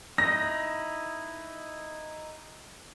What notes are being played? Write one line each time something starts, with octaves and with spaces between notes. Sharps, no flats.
D#4 E4 D#6 A#6